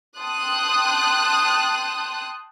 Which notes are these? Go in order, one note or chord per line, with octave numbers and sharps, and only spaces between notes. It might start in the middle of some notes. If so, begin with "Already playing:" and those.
G5 A5 C6 D#6 F#6